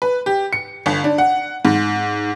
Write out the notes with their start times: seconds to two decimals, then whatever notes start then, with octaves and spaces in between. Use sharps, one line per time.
0.02 B4
0.26 G4
0.53 C#7
0.86 G1
1.04 D4
1.18 F#5
1.65 G#2